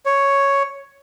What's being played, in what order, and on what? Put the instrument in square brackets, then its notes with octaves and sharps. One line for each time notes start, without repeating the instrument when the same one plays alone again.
[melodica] C#5